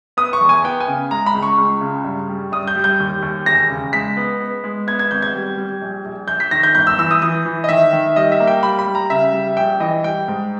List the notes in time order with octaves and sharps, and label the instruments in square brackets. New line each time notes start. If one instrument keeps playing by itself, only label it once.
[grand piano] B3 D#6
C#6
E2
G#5
B3 G5
G#5
C#3
G#3 A#5
B5
C#2
C#6
C#2
C#3
G2
G3
G2 D#6
G6
G3
G6
D#2
D#2
E1 A#6
C#3
G#3 B6
B3
B3
G#3
B3 G#6
G#6
G#1 G6
G#6
G3
G3
A#1
A#1
A#1 G6
B6
D#3 A#6
G6
G1 G6
E6
E3 E6
D#6
E3 D#6
E3
D#5
D#3 E5
D#3
G3 D#5
E5
A#3
G5
G3 B5
B5
G3
A#5
C#3 E5
G3
A#1 G5
E3 D#5
G3 G5
G#2